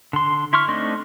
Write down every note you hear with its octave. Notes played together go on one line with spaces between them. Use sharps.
D3 C6
E4 C6 C#6 F6
A3 C4 D4 D#4 D#5